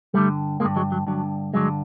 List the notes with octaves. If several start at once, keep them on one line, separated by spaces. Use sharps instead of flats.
G2 D3 G3 A3
G2 D3 G#3 A#3
F#3 G#3
F#3
G2 D3 F#3
G2 D3 F#3 G#3